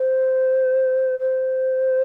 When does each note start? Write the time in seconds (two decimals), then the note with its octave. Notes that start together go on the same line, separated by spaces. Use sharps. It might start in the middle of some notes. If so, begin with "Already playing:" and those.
Already playing: C5
1.19 C5